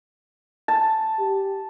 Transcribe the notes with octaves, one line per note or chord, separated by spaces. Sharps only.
A5
G4